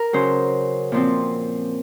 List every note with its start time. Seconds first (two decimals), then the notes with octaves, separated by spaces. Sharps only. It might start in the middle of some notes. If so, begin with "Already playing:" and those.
Already playing: A#4
0.13 C#3 F#3 C#4 C5
0.92 A#2 F3 C4